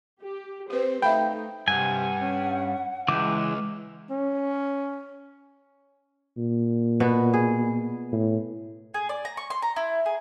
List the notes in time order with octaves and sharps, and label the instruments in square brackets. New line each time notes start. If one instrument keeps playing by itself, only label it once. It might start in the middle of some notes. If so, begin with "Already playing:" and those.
[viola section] G4
[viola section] C4 C5 [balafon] G4 B4
[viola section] A3 D#4 [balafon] E5 F5 B5 [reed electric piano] G5
[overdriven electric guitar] G2 [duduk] C3 [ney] F#5 [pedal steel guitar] G#5
[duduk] C#4
[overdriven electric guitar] C#2 [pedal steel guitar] E3 D6 [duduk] G#3
[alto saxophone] C#4
[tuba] A#2
[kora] B2 B3 F#4
G#4
[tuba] A2
[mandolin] G#4
D5
A#5
C#6
C6
A#5
E4
G#4